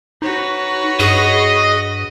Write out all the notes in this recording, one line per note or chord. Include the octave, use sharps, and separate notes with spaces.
D#4 F#4 B4 C#5
G2 G#4 D#5